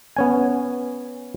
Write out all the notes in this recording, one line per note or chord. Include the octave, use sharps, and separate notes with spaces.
B3 C#4 G#5